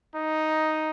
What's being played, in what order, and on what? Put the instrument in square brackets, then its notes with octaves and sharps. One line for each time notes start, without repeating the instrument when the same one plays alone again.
[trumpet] D#4